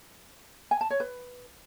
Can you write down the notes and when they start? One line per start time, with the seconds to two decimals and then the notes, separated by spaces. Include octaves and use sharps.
0.71 G#5
0.81 A5
0.90 C#5
1.00 B4